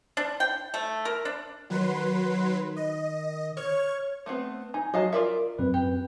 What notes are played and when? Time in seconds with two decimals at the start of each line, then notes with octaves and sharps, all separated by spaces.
0.17 D4
0.40 G5
0.74 A3
1.05 A#4
1.25 D4
1.70 D#3 F#3 B4 C6
2.76 D#5
3.57 C#5 C#6 F6 G#6
4.26 A3 B3 C4
4.74 D#4 G#5
4.94 F#3 D#5 F5 A5
5.13 F4 A#4 D5 E5
5.59 F#2 C4 B4
5.74 G4